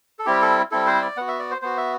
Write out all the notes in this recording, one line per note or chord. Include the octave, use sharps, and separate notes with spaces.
A4
G3 C4 E4 G4
A4
G3 C4 E4 A4
C5
D5
B3 F#4 F#5
E5
D5
C5
B3 F#4 C5
E5